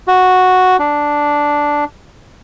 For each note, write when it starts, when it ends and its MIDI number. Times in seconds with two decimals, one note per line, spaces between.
0.08 0.77 66
0.79 1.84 62